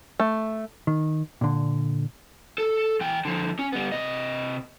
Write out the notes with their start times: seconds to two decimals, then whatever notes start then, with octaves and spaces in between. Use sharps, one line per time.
0.20 A3
0.87 D#3
1.41 A#2 D3
2.58 A4
3.01 E3 G5
3.25 D3 F3
3.59 C#4
3.73 G3 B3
3.92 C3 D#5